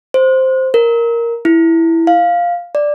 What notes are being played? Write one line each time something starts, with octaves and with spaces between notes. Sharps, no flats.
C5
A#4
E4
F5
D5